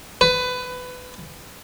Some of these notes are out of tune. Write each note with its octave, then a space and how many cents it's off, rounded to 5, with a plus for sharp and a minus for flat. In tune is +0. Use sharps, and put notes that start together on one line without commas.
B4 +20